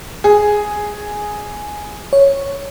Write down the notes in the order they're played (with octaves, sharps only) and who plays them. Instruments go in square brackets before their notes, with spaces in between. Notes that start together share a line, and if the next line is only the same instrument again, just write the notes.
[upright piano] G#4
[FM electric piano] C#5